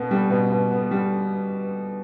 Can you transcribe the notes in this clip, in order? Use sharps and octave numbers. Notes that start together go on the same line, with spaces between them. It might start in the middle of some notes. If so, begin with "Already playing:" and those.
Already playing: B2 B3
G3
B2
B2
B3
G3